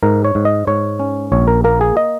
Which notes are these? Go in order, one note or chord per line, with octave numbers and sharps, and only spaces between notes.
G#2 A#4
C#5
G#2
D#5
G#2 C#5
C#4
A#1 C#5
A#4
A#3 A#4
G#4
D#5